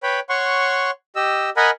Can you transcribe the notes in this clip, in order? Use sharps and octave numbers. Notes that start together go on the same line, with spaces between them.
B4 C#5 G5 B5
C#5 F#5 C6 C#6
G4 D#5 E6
A#4 D#5 F#5 G#5 B5